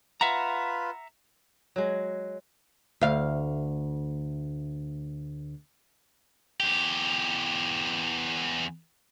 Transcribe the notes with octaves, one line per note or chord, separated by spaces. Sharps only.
F4 B4 E5 F#5 A#5
F#3 G#3
D2 F5
E2 G4